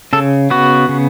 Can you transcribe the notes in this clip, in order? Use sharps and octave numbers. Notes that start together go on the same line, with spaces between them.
C#3 A4
B3 F#4
C#3